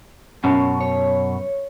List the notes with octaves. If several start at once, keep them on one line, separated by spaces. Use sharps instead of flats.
F#2 B2 C#4
C#5